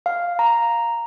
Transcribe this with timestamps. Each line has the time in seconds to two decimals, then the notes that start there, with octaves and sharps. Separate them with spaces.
0.06 F5
0.39 A#5